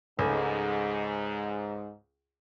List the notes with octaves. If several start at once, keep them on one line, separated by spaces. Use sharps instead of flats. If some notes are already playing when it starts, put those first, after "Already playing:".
C#2 G#2 A3